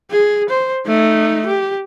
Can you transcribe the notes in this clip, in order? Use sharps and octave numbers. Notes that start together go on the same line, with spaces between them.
G#4
C5
A3 D#4
G4